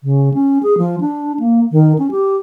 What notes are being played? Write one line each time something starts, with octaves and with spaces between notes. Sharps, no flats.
C#3
C#4
G#4
F3
D4
A#3
D#3
C#4
G4